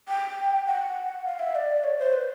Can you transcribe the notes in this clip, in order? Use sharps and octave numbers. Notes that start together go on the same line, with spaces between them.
G5
F#5
F5
E5
D5
C#5
C5
B4